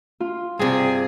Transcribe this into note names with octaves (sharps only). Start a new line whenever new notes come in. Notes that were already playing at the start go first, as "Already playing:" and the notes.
F4
G2 C3 G#4